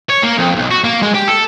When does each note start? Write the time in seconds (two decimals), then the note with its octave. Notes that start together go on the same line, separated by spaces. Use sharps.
0.10 C#5
0.23 A#3
0.39 F2
0.56 B1
0.71 F#4
0.84 A#3
1.02 G#3
1.14 G4
1.28 A4